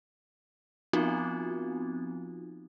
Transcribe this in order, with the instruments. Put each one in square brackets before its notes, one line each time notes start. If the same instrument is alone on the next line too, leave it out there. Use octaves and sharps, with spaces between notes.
[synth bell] F3 B3 C4 D#4 F4 F#4